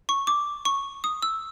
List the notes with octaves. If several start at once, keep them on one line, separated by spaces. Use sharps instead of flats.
C#6
D6
C#6
D#6
E6